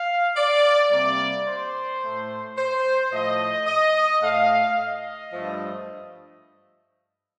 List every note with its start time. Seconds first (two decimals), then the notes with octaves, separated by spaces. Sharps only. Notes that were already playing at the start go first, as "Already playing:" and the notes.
Already playing: F5
0.37 D5
0.91 C3 G3 A#3 D5
1.47 C5
2.02 A2 A3
2.57 C5
3.12 A2 F3 A3 D#5
3.67 D#5
4.22 A2 A3 F5
4.78 D#5
5.32 G2 F3 A3